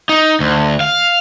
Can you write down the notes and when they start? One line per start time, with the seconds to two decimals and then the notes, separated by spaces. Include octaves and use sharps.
0.09 D#4
0.40 D2
0.80 F5